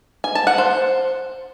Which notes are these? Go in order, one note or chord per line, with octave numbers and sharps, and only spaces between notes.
G#5
A5
F#5
C5